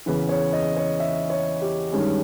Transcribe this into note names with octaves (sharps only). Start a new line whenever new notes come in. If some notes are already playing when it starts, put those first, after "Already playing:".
E2 C#3 E3 B4
C#5
D#5
C#5
E5
C#5
G4
G2 D#3 G#3 C#4 G#4